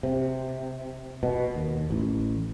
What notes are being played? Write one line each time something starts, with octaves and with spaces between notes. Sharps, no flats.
C3
B2
D#2
A1